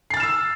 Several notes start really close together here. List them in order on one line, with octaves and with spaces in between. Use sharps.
C7 A6 F6 E7 E6